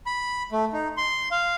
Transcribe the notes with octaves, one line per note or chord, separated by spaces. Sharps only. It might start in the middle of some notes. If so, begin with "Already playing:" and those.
B5
A3
D#4
C6
F5